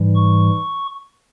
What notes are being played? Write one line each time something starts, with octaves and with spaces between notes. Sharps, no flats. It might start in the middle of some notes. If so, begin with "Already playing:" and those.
Already playing: G#2 E3 G3
C#6